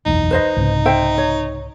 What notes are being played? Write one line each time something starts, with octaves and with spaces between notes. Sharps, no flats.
F#1 B1 E2 D#4
B4 C5 D#5
C2 G#2 C#3
C5 E5 G5
C#5